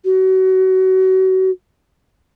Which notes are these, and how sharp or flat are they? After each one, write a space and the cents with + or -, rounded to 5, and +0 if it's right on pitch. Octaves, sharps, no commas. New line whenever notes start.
F#4 +30